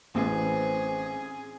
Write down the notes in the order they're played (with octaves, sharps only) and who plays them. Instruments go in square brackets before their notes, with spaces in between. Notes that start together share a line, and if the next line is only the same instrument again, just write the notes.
[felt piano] A1 [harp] C4 D4 B4 [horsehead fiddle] G#4